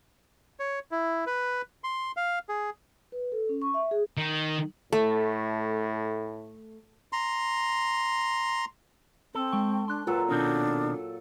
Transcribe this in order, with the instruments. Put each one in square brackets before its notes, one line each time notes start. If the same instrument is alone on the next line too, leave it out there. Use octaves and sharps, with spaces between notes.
[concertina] C#5
E4
B4
C6
F5
G#4
[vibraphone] B4
A4
C#4
C#6
E5
G#4
[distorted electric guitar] D#3
[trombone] A2 [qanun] A3
[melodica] A#5 C6
[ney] C4 [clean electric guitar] A4
[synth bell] G#3 G5 C#6
[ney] D4 [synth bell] C6 F#6
[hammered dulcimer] A#2 F#3 A4 [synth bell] F4 [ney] B4
[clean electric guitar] B2 D#3 C4 [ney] D4